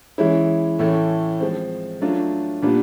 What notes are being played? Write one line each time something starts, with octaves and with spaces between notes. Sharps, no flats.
E3 G#3 C#4 E4
A2 E3 A3 C#4
F3 G#3 C4
F#3 A3 D4 F4
A#2 G3 B3 D4 F4